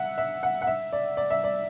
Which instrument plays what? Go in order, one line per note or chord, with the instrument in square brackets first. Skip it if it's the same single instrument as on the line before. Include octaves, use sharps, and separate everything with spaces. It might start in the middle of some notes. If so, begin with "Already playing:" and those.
Already playing: [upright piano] E5 F#5
E5
F#5
F#5
E5
D5
D5
E5
D5